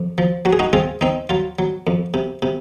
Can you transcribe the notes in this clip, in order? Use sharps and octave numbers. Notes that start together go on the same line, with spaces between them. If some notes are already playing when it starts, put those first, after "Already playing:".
Already playing: F2
F3
F#3 F#4
G#4
D#4 F#4
C4 F4 G#4
C4 D#4
F#3 F4
F#3
F2
C3
C3